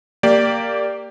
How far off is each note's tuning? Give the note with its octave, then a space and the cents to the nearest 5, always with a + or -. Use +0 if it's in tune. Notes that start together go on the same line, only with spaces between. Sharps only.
A#3 -15 G4 +0 D5 +0